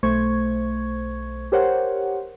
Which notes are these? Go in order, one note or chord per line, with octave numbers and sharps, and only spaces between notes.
B1 A3 C5 C#6 G#6
G4 A#4 C5 C#5 F#5